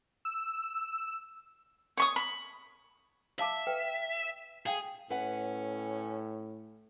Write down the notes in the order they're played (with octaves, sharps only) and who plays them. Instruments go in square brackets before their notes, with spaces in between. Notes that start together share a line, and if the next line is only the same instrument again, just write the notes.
[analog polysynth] E6
[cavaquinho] C#5 C#6 D#6
B5
[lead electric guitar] E5 [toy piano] F5 A5 D6
[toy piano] B4 G5
[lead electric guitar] G#4 [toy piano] F5 G5
[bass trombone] A2 [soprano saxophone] C#4 [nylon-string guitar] B4 F#5